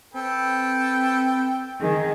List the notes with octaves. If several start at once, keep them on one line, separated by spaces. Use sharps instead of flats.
C4 A4 B4 G5
D#3 G#4